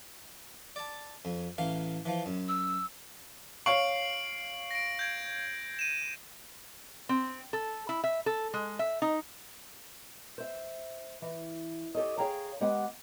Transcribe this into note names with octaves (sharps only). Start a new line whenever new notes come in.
D5 A5
F2
A1 E3 F5
E3 F3
F#2
E6
C#5 F5 C#6 C7 D7 F#7
A#6 D7
G6 G#6 D7
D#7 E7
C4
A4
E4
E5
A4
G#3
E5
D#4
C5 E5
E3
G4 A4 C#5 D#5
G#4 C#5 F5 G5 A#5
G#3 B3 G4 F#5